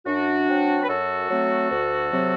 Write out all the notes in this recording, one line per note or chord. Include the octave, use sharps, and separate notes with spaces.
F#2 D4 F#4
F#3 C4
B4
F#2 F#4 A4
F#3 A3 C4
D2
C3 F#3 C4